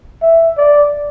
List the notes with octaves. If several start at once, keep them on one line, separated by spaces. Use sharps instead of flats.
E5
D5